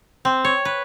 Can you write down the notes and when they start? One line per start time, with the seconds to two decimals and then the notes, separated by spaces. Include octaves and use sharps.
0.25 C4
0.44 C#5
0.65 B4